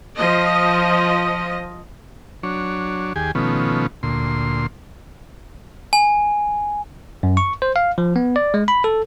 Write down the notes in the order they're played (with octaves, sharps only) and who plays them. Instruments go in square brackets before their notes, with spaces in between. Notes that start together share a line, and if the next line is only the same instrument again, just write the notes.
[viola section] F3 D#5
[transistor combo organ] F#3 D4 C#5
D#2 G4 G#4 G#5
B2 D#3 F3 A3 B3 C#4
D2 A#2 C6
[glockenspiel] G#5
[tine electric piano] F#2
C#6
C5
F5
F3
B3
D5
G#3
B5
A4